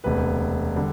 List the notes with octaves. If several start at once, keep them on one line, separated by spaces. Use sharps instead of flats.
E1 D2 C3 B4
D3 G3